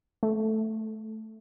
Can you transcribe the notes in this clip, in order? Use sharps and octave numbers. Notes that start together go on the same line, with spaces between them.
A3